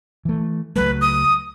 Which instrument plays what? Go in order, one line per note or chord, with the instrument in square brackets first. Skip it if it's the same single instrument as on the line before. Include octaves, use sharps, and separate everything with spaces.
[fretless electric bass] E3 A3
[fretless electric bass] C#2 F#3 A3 [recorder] B4
[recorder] D#6